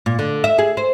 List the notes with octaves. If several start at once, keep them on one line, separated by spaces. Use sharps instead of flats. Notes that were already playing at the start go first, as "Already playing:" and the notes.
A#2
D3
E5
G#4
C5